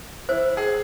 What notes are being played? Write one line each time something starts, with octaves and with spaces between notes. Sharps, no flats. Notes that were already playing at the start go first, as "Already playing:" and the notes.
E4 C5
G#4